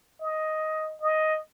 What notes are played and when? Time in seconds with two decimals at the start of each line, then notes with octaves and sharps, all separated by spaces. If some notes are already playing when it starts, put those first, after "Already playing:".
0.21 D#5
1.02 D#5